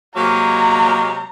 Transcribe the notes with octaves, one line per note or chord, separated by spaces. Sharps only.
C3 F#3 G#3 A#3 A#5